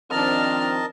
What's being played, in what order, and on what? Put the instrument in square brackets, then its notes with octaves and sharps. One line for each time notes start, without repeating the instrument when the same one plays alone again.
[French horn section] D#3 F3 C4 [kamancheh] D4 F6 [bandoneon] A#4 D#5 A5